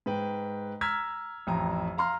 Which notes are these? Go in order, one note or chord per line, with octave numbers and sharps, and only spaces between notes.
G#2 B4 G5
A#5 E6 F6 G#6 B6
A1 F2 A#5
F5 A#5 C6 F6